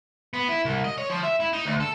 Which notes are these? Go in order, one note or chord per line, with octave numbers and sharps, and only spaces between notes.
B3
E4
C2
D#5
C#5
F3
E5
E4
D#4
D2
A4